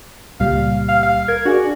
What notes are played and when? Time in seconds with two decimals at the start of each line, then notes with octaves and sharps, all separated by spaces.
0.40 C#2 A#2 G3 F5
0.89 F5
1.03 F5
1.28 A#4 G#6
1.45 D4 F#4 G#4 D5